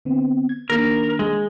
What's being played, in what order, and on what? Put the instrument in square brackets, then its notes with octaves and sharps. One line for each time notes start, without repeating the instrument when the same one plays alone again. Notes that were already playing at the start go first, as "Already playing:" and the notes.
[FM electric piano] D3 B3 C4
G#6
[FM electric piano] D#3 A#3 D4 [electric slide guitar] A#4
[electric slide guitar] G#3